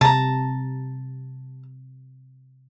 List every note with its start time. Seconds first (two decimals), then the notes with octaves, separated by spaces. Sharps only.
0.01 C3 A5 A#5